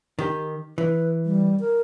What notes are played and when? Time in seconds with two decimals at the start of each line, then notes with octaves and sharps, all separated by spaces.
0.19 D#3 G4
0.78 E3 B4
1.25 G3
1.60 A#4